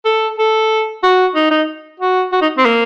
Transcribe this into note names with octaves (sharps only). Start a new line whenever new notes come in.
A4
A4
F#4
D#4
D#4
F#4
F#4
D#4
C4
A#3